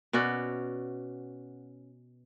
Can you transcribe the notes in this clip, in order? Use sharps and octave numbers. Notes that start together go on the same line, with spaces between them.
B2 C#4 F#4 D5